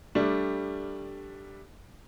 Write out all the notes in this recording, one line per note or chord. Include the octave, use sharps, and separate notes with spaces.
G3 A3 D4